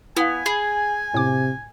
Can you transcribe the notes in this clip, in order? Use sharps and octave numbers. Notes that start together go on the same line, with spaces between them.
B3 E4 F5 G#5
G#4 B5
A2 C3 D6